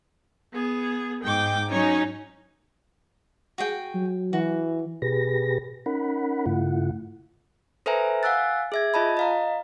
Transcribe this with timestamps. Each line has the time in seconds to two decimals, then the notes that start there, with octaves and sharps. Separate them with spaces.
0.53 B3 G#4
1.23 G#2 G5 D6
1.71 F#3 C#4 D#4 C#5
3.58 F#4 G#4 G5
3.94 F#3
4.33 E3 F#4
5.02 B2 G4 G#4 B4 A#6
5.86 C#4 D#4 A#4 F#5 B5
6.46 G2 C#3 A3 E4 F4 F#5
7.86 A4 B4 C5 E5 G#5 A#5
8.23 F5 F#5 G#5 E6 F#6 A6
8.72 G#4 E5 G#6
8.94 F4 D#5 A5 B5
9.17 D#5 F5 A#5